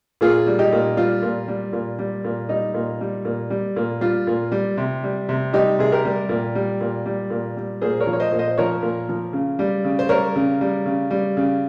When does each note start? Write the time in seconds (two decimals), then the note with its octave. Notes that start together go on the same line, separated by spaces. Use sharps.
0.21 A#2 F4 G#4
0.47 G3
0.59 D#4 G4
0.73 A#2
0.97 G3 F4
1.23 A#2
1.48 G3
1.73 A#2
1.99 G3
2.25 A#2
2.49 G3 D#4
2.74 A#2
3.01 G3
3.25 A#2
3.50 G3
3.76 A#2
4.01 G3 F4
4.27 A#2
4.52 G3
4.77 C3
5.04 G3
5.29 C3
5.53 G3 D#4 G4
5.79 C3 G#4
5.92 G4 A#4
6.05 G3
6.29 A#2
6.55 G3
6.81 A#2
7.06 G3
7.30 A#2
7.57 G3
7.81 A#2 G#4 C5
8.00 A#4 C#5
8.07 F3
8.13 C#5
8.20 C5 D#5
8.32 A#2
8.39 C5 D#5
8.58 F3 A#4 C#5
8.83 A#2
9.09 F3
9.33 C#3
9.59 G3
9.85 C#3
9.99 C5
10.09 G3 A#4 C#5
10.36 C#3
10.61 G3
10.86 C#3
11.11 G3
11.37 C#3